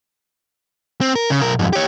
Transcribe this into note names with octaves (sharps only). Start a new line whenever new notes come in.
C4
A#4
C#3
B1 A#4
F2 G#2
G4 C#5